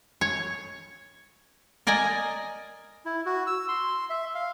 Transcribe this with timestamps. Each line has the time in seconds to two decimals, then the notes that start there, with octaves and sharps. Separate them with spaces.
0.21 C#5
1.87 A#4 D5 D#5 G#5 A#5
3.05 E4
3.26 F#4
3.47 E6
3.68 C6
4.10 E5
4.35 F5